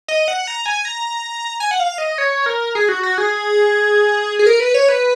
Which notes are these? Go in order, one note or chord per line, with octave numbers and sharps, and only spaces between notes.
D#5
F#5
A#5
G#5
A#5
G#5
F#5
F5
D#5
C#5
A#4
G#4
F#4
F#4
G#4
G#4
A#4
B4
C#5
B4